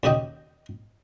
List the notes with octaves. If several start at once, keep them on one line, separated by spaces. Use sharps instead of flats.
D#2 C#3 F#4 D#5 G5